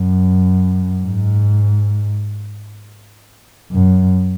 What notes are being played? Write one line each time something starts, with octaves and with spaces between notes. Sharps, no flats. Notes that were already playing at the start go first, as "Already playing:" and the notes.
Already playing: F#2
G#2
F#2